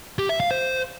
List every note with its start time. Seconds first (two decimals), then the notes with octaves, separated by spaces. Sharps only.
0.19 G4
0.29 E5
0.40 F5
0.51 C5